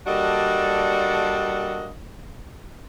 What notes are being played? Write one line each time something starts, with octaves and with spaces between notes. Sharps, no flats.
G3 A#3 D4 F#4 A4 D#5